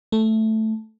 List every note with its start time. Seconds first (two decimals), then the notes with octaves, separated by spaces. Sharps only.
0.12 A3